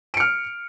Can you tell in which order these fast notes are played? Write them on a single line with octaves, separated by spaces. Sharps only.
D7 C#7 F6